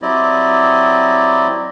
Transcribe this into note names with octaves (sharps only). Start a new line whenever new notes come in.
F#3 C4 E4 G4 D5 D#5